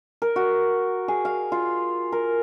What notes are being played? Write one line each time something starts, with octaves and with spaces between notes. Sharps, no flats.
A#4
F#4
G#4
F5
F4
A#4